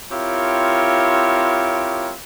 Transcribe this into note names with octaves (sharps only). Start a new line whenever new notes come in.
C4 E4 F4 G4 A#4 C#5